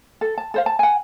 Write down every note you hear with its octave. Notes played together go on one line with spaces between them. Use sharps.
A4
A5
A4 C5 F5
A5
F#5 G#5